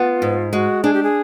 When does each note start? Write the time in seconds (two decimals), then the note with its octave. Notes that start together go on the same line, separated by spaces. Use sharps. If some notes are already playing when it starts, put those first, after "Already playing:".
Already playing: B3 F4
0.22 G#2
0.52 G#3 F#4
0.84 D4 G#4
0.93 G4
1.03 G#4